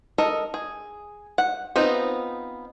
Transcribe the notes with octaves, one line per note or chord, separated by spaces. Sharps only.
A4 A#4 D#5
G#4
F#5
B3 C4 D#4 F4